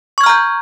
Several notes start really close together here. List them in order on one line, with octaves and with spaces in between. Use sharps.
C#6 G#6 F6 A#5 G6